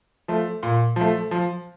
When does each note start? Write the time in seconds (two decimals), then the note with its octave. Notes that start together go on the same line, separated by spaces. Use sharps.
0.28 F3 A3
0.63 A#2
0.96 F3 A3
1.31 F3